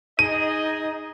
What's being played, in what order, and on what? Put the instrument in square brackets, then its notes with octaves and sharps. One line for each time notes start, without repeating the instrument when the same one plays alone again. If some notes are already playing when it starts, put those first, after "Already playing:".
[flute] D#4 [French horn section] G#4 D#5 [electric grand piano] D#7